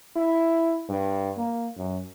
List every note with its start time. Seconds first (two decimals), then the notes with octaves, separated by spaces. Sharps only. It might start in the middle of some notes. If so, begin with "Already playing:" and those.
0.16 E4
0.89 G2
1.37 A#3
1.76 F#2